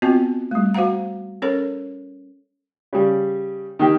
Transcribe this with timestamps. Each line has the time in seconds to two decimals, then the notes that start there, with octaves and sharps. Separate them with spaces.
0.02 B3 C4 F4 F#4 D#5 A5
0.51 G3 A3
0.74 F#4 C5 F5 F#5 A#5
1.42 C#4 A4 A#4 C#5
2.93 C#3 G3
3.79 D#3 A#3 G4